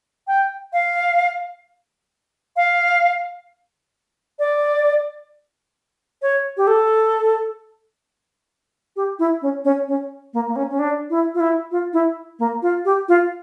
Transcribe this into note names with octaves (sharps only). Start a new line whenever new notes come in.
G5
F5
F5
D5
C#5
G4
A4
G4
E4
C#4
C#4
C#4
A#3
A#3
C#4
C#4
D4
E4
F4
E4
F4
E4
A#3
F4
G4
F4